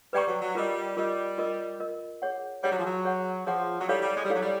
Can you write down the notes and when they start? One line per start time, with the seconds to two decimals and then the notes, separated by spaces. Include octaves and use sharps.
0.13 G3 B4 D5 G5 A#5 C#6
0.28 F#3
0.41 F#3
0.55 G3 F4 A#4 D#5
0.97 G3 F4 A#4 D#5
1.38 F4 A#4 D#5
1.80 F4 A#4 D#5
2.22 G#4 C#5 F#5
2.63 G3 G#4 C#5 F#5
2.71 F#3
2.79 F3
2.86 F#3
3.05 G#4 C#5 F#5
3.46 F3 G#4 C#5 F#5
3.79 F#3
3.88 G3 E4 A4 C#5 F5
4.02 G3
4.16 G#3
4.24 G3
4.30 F#3 E4 A4 C#5 F5
4.42 G3